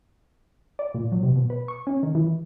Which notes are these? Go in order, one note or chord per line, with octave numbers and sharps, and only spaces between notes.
D5
A#2
F#3
C3
B2
B4
C#6
C#4
D#3
E3